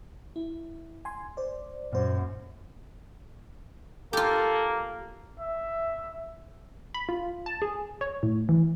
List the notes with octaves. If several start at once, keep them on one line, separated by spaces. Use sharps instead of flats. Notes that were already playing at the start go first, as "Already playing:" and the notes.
E4
G#5 C6
C5 D5
F#2 A#2 C5
A#3 F4 G4 A4
E5
B5
F4
A5
G#4
C#5
A2
E3